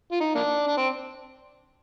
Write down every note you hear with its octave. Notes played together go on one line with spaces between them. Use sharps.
F4
D#4
A#3 D4
D4
C4